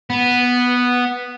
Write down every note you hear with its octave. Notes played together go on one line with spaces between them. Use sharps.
B3